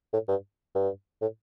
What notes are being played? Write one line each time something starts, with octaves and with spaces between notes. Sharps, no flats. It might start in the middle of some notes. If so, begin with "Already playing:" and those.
A2
G2
G2
A2